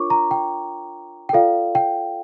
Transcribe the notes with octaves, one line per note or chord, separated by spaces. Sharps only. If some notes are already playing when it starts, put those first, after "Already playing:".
Already playing: D4 F4 A#4 C#5 C#6 D6
A#5
G5
G5
F4 A4 D5 F5
G5